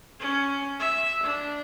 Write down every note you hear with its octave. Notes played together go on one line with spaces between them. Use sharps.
C#4
E5
D4